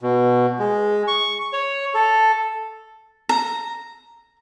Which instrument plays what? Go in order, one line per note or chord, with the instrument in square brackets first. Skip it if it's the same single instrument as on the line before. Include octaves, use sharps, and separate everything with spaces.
[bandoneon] B2
G#3
C#6
C#5
A4
[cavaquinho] A#5